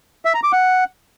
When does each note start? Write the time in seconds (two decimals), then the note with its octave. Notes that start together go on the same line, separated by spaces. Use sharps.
0.25 E5
0.34 A#5
0.43 D6
0.53 F#5